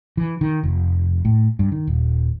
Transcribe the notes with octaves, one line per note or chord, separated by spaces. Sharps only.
E3
D#3
F1
A2
G2
D#3
D#1